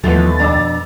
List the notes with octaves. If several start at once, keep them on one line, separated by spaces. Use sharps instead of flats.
D#2 E3 F3 A3 B3 A6
F2 B2 D4 A#5 D6 E6